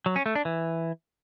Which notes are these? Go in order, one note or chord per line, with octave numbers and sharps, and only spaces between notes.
F#3
C#4
A3
D4
E3